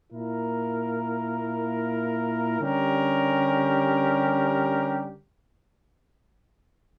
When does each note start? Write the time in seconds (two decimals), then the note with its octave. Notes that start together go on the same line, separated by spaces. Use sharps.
0.13 A#2 A#3 E4 A#4
2.61 D3 G3 C#4 G4 A#4